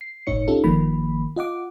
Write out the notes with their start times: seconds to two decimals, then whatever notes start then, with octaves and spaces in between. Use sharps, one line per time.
0.01 C7
0.27 G1 C2 A2 D#4 C#5 C#7
0.48 C#4 D#4 F4 G4 A4
0.64 G1 D#3 F3 A#3 B5
1.36 F4 D#5 F#5 D6